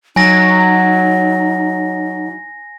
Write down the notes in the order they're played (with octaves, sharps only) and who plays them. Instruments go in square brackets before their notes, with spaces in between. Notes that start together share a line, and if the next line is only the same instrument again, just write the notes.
[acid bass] F#3 [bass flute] D#4 [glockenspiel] G#5 A#6